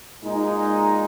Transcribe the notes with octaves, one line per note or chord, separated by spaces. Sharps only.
A#2 G#3 D#4